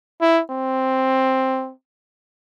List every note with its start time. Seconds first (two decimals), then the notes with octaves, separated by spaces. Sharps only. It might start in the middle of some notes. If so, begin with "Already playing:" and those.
0.21 E4
0.51 C4